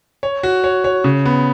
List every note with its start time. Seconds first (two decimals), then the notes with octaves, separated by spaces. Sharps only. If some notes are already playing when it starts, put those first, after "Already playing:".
0.23 C#5
0.43 F#4
0.64 C#5
0.84 C#5
1.04 C#3
1.26 B3